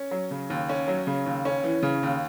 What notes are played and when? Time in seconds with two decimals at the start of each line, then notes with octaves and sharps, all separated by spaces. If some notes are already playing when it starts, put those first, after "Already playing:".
Already playing: C#4
0.11 F#3
0.31 C#3
0.50 D#2
0.69 C#4
0.88 F#3
1.07 C#3
1.26 D#2
1.45 C#4
1.64 E3
1.83 C#3
2.03 D#2